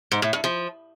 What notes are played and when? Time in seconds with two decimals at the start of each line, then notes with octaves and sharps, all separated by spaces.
0.12 G#2
0.22 A2
0.33 G2
0.44 F3